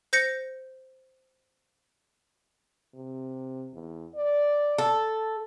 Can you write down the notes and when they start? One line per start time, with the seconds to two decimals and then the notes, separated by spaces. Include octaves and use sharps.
0.13 C5 G6 A#6 C#7
2.94 C3
3.73 E2
4.16 D5
4.78 A4